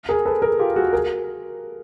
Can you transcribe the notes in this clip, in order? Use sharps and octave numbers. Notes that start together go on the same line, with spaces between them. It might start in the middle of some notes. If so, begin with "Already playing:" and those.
G#4 A#4
A4 B4
G#4 A#4
F4 G4
F#4 G#4
G#4 A#4